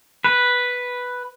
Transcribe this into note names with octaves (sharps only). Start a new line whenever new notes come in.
B4